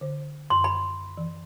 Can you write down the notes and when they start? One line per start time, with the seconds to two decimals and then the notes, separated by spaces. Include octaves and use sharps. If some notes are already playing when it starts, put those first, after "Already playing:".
0.01 D3 C5
0.50 F#2 C6
0.64 B5
1.17 E3